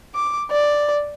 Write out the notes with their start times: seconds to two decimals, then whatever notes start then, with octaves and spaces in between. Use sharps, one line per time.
0.15 D6
0.51 D5